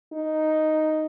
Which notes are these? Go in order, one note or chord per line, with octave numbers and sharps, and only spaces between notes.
D#4